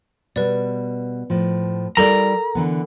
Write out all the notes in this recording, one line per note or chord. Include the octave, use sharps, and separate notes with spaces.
B2 G3 B4 D5
A2 F3
G3 E4 A4 A#4 D5 A#5
D3 E3 B3